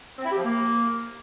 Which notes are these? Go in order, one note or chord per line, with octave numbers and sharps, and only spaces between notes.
C4
E4
G4
F3
A#3